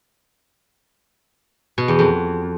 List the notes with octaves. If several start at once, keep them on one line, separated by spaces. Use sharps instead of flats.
B2
E2
F2